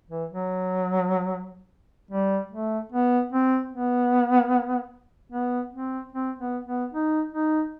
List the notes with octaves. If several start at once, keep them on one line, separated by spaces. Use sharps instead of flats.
E3
F#3
G3
A3
B3
C4
B3
B3
C4
C4
B3
B3
D#4
D#4